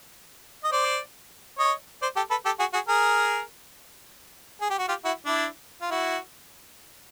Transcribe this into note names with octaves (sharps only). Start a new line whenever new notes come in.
D#5
C5 D5
C#5 D#5
C5 D5
G4 A4
A4 B4
G4 A4
F#4 G#4
F#4 G#4
G#4 A#4
G#4
G4
F#4
F4 G4
E4 F#4
D4 E4
F4
E4 F#4